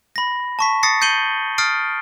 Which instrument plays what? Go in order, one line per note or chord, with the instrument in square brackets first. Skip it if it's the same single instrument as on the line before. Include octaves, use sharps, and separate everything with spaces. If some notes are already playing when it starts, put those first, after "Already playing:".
[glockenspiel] B5 A#6
A5 C#6 B6
D#6 A6 A#6 C7 C#7
G6 C7 C#7 D#7 F#7 G7
D#6 F6 A6 C7 D7